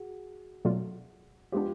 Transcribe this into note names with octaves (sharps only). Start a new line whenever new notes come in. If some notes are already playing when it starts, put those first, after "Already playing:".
Already playing: F#4 G#4
B2 F#3 A3 D4 F4
F3 G#3 B3 D4 F4 G4